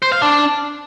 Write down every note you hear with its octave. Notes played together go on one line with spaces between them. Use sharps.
C5
F5
D4